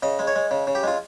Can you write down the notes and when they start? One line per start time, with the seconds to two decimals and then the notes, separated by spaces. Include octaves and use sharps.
0.03 C#3 D#5
0.19 G#3
0.27 C#5
0.36 G#3
0.51 C#3
0.67 C#3
0.75 G4
0.83 G#3 F4